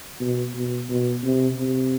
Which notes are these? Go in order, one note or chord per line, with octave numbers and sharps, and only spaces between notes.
B2
B2
B2
C3
C3